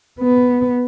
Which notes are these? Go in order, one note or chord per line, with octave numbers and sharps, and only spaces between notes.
B3